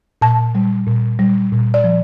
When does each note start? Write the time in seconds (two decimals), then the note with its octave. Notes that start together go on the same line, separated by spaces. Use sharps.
0.22 A#2 A5
0.55 G3
0.87 A#2
1.19 G3
1.52 A#2
1.74 D5
1.84 F3